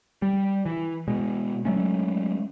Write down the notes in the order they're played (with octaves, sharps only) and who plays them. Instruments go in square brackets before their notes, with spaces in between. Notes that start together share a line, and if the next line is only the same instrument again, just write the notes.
[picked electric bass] G3
E3
B2 G#3
F#3 G#3 A3 C#4